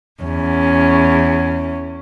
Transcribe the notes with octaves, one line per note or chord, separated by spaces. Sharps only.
E2 C#4